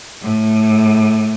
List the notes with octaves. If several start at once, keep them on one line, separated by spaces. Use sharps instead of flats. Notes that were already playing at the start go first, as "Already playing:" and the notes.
A2